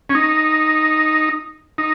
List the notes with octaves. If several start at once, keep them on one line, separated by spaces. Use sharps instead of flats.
C#4
D#4
D#4